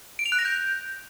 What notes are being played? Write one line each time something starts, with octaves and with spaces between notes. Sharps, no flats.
D7
F7
F#6
A#6
G6